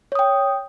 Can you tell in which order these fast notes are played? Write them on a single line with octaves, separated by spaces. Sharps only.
C#5 D#6 G5